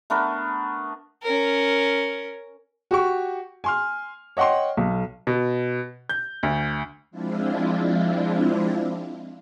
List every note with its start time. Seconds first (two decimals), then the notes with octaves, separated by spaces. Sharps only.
0.10 A3 B3 D4 A#4
1.22 C#4 A#4
2.91 F#4 G4 C#6
3.64 G#5 C6 F6
4.37 C#5 D#5 F#5 G5 C6
4.77 B1
5.27 B2
6.09 G6
6.43 D2
7.11 F3 G#3 C4 D4 E4 F4